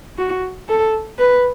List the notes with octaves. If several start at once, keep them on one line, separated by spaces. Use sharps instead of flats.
F#4
A4
B4